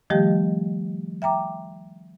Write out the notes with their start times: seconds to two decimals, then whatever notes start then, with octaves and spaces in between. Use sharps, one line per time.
0.10 D#3 F3 G3 A3 G4 D#5
1.22 E5 G5 A#5 D6